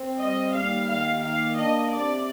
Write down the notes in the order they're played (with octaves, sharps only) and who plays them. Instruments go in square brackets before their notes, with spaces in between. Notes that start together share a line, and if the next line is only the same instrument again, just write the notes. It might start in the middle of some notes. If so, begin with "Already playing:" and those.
Already playing: [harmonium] C4
[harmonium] G3 [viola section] D#5
[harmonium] D#2 [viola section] F5
[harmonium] D#3 [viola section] F5
[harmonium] A#3 [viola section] F5
[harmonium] D4 [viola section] D#5
[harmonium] C3 [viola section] D5